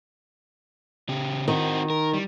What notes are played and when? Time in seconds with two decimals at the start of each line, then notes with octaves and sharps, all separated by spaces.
1.09 C#3 G4
1.48 D#3 C4 F#4
1.90 A#4
2.14 G3